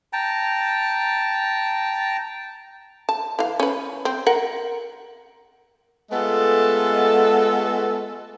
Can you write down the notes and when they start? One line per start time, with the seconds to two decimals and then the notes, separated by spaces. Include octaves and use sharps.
0.13 G5 A5 A#5
3.09 A5
3.39 E3 F5
3.60 C#4 B4
4.05 C4
4.27 A#4 F#5
6.11 G#3 A3 B3 F4 G#4 A4